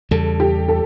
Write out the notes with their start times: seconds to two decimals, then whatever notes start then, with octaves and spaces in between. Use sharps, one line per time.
0.11 E2 C#3 G3 A4
0.40 G4
0.68 A4